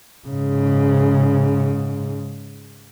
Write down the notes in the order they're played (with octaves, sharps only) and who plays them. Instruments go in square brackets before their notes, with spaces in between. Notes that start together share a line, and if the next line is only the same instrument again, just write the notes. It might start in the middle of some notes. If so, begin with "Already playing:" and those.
[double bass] G#2 C#3